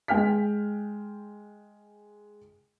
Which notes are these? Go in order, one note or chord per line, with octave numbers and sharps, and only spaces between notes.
G#3 G5 F6 B6